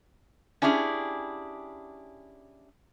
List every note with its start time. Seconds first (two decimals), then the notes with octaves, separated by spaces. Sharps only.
0.62 C#4 D4 E4 G4 G#4